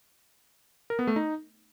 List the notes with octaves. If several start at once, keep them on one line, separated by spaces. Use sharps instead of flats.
A#4
B3
A3
D#4